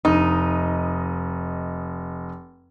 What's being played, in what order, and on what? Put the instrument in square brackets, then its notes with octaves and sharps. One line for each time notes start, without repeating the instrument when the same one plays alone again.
[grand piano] F1 D#5 [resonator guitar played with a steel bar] D#4